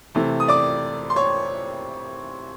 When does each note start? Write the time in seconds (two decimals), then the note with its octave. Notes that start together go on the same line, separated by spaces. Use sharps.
0.15 C3 E3 A3
0.40 D#6
0.48 D5 D6
1.10 C6
1.16 C#5 C#6